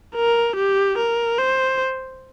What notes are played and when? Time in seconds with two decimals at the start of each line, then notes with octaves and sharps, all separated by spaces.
0.16 A#4
0.56 G4
0.98 A#4
1.38 C5